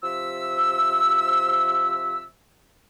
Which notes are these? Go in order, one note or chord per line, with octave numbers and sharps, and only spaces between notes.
C3 F3 E5 E6